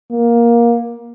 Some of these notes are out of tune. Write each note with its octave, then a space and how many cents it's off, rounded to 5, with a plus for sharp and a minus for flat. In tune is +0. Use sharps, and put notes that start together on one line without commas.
A#3 +15